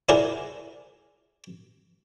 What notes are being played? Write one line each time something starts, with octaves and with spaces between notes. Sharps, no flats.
E4 G#4 A#4 C5 D5 F#5